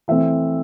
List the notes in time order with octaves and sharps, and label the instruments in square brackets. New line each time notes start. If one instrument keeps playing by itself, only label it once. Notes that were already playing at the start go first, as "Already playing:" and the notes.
[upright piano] E3 A3 C4 E5